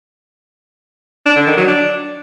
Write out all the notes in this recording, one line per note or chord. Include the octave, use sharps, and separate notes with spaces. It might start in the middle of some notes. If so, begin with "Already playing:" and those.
D4
D3
D#3
F#3
D4